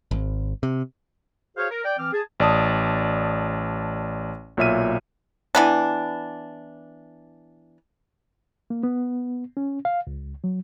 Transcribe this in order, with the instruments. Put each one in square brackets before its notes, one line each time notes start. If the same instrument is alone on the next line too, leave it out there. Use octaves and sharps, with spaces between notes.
[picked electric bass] G#1
C3
[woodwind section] F#4 G#4 C5 C#5 F5
A#4
D5 G5
E3 C4 D6 F6
G#4 A5
[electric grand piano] A1 D5 A5 D#6
B1 A#2 C#5 E5 F6 D#7
[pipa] E3 B3 D4
[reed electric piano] A#3
B3
C#4
F5
C#2
F#3